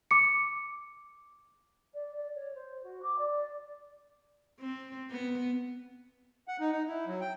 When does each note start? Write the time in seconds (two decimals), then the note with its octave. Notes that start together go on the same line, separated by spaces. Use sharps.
0.11 D6 C#7
1.94 D5
2.16 D5
2.35 C#5
2.55 C5
2.83 F#4
3.02 D6
3.18 D5
4.60 C4
5.11 B3
6.48 F#5
6.60 D#4
6.72 D#4
6.88 E4
7.07 F#3
7.21 G5